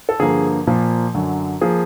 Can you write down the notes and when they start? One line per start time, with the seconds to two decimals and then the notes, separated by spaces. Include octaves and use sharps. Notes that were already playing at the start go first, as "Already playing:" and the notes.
0.09 A4
0.19 G2 D3 F3 A#3 G#4
0.67 A#2 F3 A#3
1.14 F#2 D3 F#3
1.61 F3 A#3 G#4